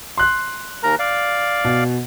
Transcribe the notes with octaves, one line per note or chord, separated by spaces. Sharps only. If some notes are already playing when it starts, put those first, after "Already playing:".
C6 F#6
D#2 A#4 A#5
D5 F5
B2